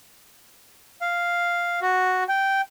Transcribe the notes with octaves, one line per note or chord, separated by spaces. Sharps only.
F5
F#4
G5